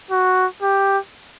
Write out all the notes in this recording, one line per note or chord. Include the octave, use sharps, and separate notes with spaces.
F#4
G4